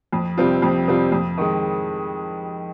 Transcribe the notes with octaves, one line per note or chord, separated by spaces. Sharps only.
F2
C3 G3 C4 F4
F2
C3 G3 C4 F4
F2
D#3 G#3